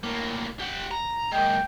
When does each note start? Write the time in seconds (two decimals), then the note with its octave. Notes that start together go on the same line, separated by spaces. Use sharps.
0.03 A2 A#3
0.60 G4 F#5
0.91 A#5
1.32 G#3 A#3 G5